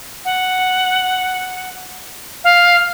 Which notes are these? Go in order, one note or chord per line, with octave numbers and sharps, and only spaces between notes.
F#5
F5